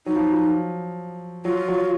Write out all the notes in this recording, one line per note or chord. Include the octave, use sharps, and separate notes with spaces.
F#3 D#4
F3
F3
F#3 F4
F#3